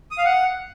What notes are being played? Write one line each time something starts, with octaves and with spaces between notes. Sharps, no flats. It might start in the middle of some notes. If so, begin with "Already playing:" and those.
D#6
F5
F#5